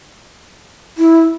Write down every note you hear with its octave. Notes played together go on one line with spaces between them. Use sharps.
E4